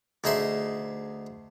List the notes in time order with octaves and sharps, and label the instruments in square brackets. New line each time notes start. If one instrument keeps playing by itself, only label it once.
[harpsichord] D2 D#4 G#4 E5 C6